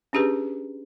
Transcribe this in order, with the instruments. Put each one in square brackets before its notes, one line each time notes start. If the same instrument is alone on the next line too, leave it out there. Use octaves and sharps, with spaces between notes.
[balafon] C#4 D4 G4 G#4 B4